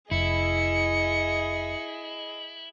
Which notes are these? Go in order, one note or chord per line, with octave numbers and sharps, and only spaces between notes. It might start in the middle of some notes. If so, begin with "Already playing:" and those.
F1 E4 G#4 D#5 C#7